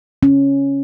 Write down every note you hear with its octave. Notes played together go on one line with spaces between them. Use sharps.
C#4